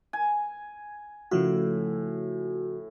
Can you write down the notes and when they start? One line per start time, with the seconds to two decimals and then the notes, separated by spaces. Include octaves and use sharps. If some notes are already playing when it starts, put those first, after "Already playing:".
0.13 G#5
1.31 A2 C#3 F3 F#4